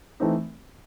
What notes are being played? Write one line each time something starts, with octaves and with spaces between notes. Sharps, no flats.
E3 A3 C4 D#4